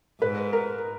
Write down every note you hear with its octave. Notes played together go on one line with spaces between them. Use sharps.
G#2 B4
A#4